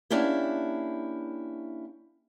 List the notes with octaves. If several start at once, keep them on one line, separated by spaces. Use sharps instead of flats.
A#3 C#4 D4 E4 G4